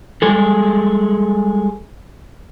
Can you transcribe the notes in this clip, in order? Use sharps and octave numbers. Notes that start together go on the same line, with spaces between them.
G3 G#3 G#4 A4